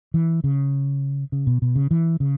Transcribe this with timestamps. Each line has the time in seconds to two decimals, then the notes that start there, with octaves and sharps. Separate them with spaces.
0.14 E3
0.44 C#3
1.32 C#3
1.47 B2
1.62 B2
1.76 C#3
1.91 E3
2.20 C#3